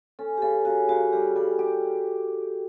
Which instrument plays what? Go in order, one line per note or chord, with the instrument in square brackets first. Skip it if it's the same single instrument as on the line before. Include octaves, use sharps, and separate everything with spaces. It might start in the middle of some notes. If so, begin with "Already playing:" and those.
[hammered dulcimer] C#4 [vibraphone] A4
[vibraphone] G4
[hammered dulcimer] C#3 [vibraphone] A4
[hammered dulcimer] C#3 [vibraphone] F#4
[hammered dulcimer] C#3 [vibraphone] F#4
[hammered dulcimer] G3 [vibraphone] G4
[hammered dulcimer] G3 [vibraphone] A4
[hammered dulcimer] G4